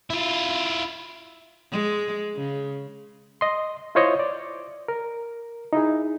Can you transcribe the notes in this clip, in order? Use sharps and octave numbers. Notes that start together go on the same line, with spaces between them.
E4 F4
G#3
C#3
D#5 C6
E4 F4 C5 C#5 D#5
D5
A#4
D#4 E4 G#4